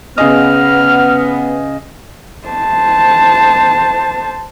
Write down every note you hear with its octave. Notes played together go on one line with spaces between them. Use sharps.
C#3 B3 G#4 D#5 F6
C5 A5